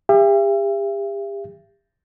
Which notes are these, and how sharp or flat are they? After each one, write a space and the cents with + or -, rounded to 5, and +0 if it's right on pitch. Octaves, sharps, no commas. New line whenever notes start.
G4 +40 E5 +40